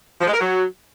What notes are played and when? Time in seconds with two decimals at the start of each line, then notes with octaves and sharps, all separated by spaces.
0.21 F3
0.27 G#3
0.34 A#4
0.40 F#3